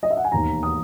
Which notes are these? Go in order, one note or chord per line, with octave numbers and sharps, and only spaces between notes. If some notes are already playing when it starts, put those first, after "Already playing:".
D#5
E5
F#5
G#5
E1 D#2 D#3 A#5
D#6